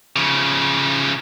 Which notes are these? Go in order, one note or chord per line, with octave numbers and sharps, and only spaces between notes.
C#3 F3